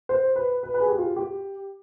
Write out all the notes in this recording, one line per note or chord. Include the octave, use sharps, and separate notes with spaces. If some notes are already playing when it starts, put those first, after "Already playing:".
C5
B4
B4
B4
G#4
G4
F4
G4